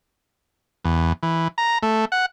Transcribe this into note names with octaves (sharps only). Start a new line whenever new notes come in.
E2
E3
A#5
A3
F#5